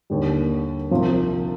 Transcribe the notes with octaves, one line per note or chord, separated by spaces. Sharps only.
D#2 D3 G3
C2 C3 F3